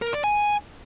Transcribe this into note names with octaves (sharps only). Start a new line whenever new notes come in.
A#4
D5
G#5